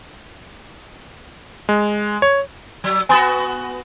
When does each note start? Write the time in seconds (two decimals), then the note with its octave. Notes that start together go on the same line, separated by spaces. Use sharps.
1.69 G#3
2.22 C#5
2.84 F#3
3.09 B3 F#4 G#5 C6 A6